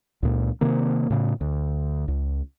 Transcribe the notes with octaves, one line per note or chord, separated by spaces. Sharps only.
C#2 A#2
C3 D#3 A#3
A2 C#3
D2
C#2